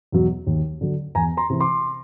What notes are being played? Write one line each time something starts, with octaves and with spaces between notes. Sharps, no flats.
E2 B2 F#3
D#2
D3 F#3
E2 G#5 A#5
A#5 C6
C3 E3
C6 D6